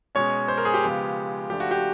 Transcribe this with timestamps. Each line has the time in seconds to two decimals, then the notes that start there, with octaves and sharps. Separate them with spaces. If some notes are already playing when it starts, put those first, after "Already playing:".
0.15 B2 G#3 C#4 C#5
0.48 C5
0.58 A#4
0.65 G#4
0.74 G4
0.83 C#3 F3 G#3 B3
1.50 C#3 F3 A3 D4 G4
1.60 F#4
1.71 G4